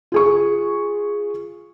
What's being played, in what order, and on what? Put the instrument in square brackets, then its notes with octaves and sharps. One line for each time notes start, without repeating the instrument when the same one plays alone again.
[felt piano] F4 G#4 C#6